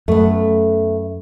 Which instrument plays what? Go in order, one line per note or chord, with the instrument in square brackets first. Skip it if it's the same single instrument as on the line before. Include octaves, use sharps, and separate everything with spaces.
[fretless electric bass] F#2 [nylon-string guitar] A3 B3